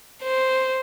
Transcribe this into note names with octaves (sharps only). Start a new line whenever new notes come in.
C5